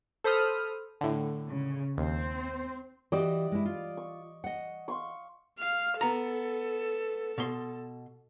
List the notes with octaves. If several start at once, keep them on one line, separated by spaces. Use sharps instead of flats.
A4 C5 B5 D#6 F6
A2 D3
C#3
D#2 C4 C5
E3 F#4 G4 D5 D#5 E6
G#3 E4
F4
C#6
D#5 F#5
F5 C6 C#6
F5
B3 A4 A#5
B2 C6